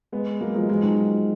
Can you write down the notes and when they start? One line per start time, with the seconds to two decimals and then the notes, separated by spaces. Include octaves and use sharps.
0.12 G#3 B3
0.41 F#3 A#3
0.55 F3 G#3
0.69 F3 G#3
0.83 D#3 F#3